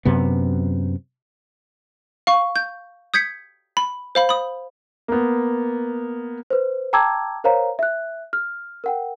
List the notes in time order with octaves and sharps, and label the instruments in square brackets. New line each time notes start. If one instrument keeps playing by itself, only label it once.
[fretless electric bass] F#2 C3 B3
[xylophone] F5 C#6
G6
D#6 G6 G#6 B6 C#7
B5
C5 F5 B5
B5 D#6
[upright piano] A#3 B3
[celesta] B4 C5
G5 A5 A#5 D6 E6 G#6
A#4 C5 C#5 F5 A#5
E5 F#6
F6
A#4 F#5 G5